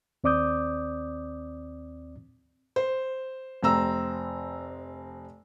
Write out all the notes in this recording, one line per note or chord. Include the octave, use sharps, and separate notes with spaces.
D#2 C4 D5 D6 D#6 G6
C5
F1 C4 A#5 E6